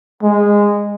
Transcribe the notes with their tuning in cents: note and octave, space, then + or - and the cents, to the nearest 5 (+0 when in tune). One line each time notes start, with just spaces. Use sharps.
G#3 -15